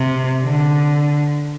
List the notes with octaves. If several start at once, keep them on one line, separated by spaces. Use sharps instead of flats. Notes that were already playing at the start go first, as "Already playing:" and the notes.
Already playing: C3
D3